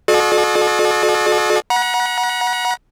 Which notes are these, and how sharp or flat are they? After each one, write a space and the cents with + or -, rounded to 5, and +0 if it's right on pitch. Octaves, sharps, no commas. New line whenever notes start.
F#4 -40 A4 -40 D5 +45
F#5 -10 A#5 +45